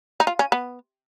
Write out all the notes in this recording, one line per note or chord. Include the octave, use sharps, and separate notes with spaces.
D#4
F4
C#4
B3